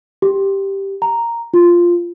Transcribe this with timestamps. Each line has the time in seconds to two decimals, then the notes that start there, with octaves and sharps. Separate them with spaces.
0.22 G4
1.02 A#5
1.54 F4